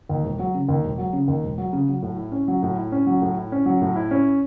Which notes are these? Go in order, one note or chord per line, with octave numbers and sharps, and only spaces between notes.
D#2
E1
F#3
C#3
D#2
E1
F#3
C#3
D#2
E1
F#3
C#3
F#3
A2
E4
C#4
F#3
A2
E4
C#4
F#3
A2
E4
C#4
F#3
A2
E4
C#4